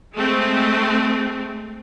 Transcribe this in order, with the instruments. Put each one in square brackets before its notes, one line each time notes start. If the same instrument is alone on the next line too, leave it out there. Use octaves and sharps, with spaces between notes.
[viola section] G#3 A3 C4